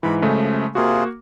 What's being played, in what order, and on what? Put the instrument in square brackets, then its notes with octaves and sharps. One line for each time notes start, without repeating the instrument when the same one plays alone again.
[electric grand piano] G#2 E3 [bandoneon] B5
[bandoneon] F#2 F3 [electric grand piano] C#3 G#3 A3
[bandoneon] C3 F4 G#4 [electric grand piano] A#3 F#4